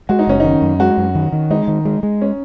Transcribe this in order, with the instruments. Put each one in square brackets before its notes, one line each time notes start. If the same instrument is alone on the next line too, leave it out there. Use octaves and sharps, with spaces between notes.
[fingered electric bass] G#3 [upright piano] F#4
[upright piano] D#4
[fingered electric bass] F#1 [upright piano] C#4
[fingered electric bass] D#3 [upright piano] D#4
[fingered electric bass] F#2
[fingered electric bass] G#3 [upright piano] F#4
[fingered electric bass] F#2
D#3
D#3
[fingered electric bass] G#3 [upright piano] D#4
[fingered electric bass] D#3
G#3
G#3
[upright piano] C#4